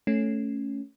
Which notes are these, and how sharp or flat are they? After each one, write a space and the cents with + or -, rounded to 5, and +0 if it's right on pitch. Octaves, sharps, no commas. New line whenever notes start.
A3 +0 C#4 +0